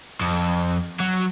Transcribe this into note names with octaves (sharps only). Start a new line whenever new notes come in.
F2
F#3